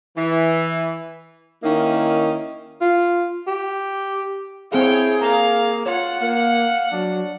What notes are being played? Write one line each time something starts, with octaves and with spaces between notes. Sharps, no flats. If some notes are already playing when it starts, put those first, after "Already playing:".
E3
D#3 A#3 C#4 D#4 E4
F4
G4
C4 E4 G#4 A4 C#5 F5 G5
A#3 F5 A#5
F4 C#5 F#5
A#3 F5
F#3 D4